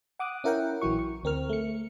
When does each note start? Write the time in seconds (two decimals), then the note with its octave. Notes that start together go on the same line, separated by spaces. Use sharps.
0.19 F#5 D6 D#6 F#6
0.44 C#4 E4 A#4 F#5 G5
0.81 A#1 E3 F#3 E4 C#6
0.99 C#6
1.23 D2 C4 A#4 F6
1.49 A3 C#7